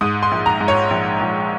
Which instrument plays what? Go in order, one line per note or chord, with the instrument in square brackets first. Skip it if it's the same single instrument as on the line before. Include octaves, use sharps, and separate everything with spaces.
[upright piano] G#2 D#6
C6
A#1
A#5
G#2
C#5
A#1
A#1